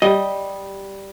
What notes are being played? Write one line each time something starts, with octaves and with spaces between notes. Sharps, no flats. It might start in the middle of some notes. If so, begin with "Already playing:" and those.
G3 D#5